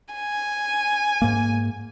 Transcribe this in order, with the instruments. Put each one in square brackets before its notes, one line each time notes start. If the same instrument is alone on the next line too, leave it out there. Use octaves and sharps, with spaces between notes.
[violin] G#5
[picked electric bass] G#2 A#3